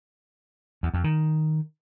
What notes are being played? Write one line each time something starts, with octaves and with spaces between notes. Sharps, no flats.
E2
F2
D#3